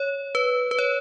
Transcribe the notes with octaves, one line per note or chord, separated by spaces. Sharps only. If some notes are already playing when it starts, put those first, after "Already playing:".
Already playing: C#5
B4
B4
C#5